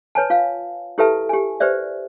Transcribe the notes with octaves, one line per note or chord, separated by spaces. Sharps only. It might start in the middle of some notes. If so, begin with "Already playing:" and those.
B4 C#5 G#5 A5
F4 F5
E4 G4 A4 B4 E5 A5
G4 G#5
G4 B4 C5 D5 E5